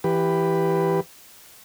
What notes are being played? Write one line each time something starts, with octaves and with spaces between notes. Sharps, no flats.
E3 G4 B4